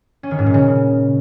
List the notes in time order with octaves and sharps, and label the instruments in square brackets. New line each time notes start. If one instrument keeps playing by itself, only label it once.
[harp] C#4
D#3
G#2
A#2
C#3